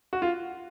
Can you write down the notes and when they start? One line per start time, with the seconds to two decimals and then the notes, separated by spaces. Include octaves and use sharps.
0.13 F#4
0.22 F4